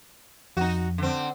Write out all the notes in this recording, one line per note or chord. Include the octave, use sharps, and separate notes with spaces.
F2 D#4 F#4
D3 C4